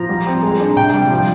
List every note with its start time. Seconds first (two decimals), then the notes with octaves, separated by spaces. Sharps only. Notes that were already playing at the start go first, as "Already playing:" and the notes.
Already playing: F3 A#5
0.09 G3
0.26 C4
0.43 G#3
0.60 D4
0.76 C3 G5
0.94 G3
1.10 F3